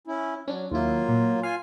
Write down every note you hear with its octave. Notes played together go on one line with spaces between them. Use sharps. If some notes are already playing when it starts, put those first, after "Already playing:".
C#4 E4
F#3 C#4 D4
D#2 F#3 A#3 E4 F4
A#2
F4 F5 G#5